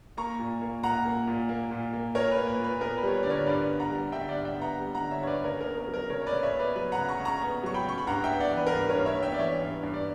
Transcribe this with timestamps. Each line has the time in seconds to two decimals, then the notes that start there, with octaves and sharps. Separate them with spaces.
0.17 A#3 A#5 C#6
0.39 A#2
0.61 A#3
0.83 A#2 F#5 A#5
1.05 A#3
1.27 A#2
1.49 A#3
1.71 A#2
1.93 A#3
2.15 A#2 A#4 C#5
2.31 B4
2.37 A#3
2.48 B4
2.59 A#2 B4
2.81 B3 A#4
2.97 B4
3.03 G3 C#5
3.14 B4
3.23 D3 D5
3.30 A#4 C#5
3.46 G2 B4 D5
3.69 B3
3.79 F#5 A#5
3.90 G3
4.12 D3 E5 G5
4.29 D5 F#5
4.34 G2
4.45 E5 G5
4.56 B3
4.61 F#5 A#5
4.78 G3
4.95 F#5 A#5
5.00 D3
5.11 C#5 E5
5.22 G2 C#5
5.27 B4 D5
5.44 C#3 A#4 C#5
5.60 A#4
5.66 B3
5.77 A#4
5.88 F#3
5.94 A#4
6.10 C#3 A#4 C#5
6.22 C#5
6.26 B4 D5
6.32 C#3
6.43 C#5 E5
6.54 B3
6.59 B4 D5
6.76 F#3 B4
6.92 F#5 A#5
6.98 C#3
7.09 A#5 C#6
7.19 C#3
7.25 A#5 C#6
7.41 B3
7.63 F#3 C#6
7.74 G5 B5
7.85 C#3 C#6
7.98 B5
8.07 G2 F#5 A#5
8.24 E5 G5
8.29 B3
8.40 D5 F#5
8.51 E3
8.57 B4
8.67 A#4
8.73 G2 B4
8.89 A#4 C#5
8.95 G2
9.06 C#5 E5
9.17 B3
9.22 E5 G5
9.34 D5
9.39 E3 C#5 E5
9.61 G2
9.83 G2
9.94 D5